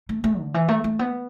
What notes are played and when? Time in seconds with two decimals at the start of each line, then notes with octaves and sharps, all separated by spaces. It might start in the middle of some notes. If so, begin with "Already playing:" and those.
0.09 A3
0.24 A3
0.39 D3
0.54 E3
0.68 A3
0.84 A3
0.99 B3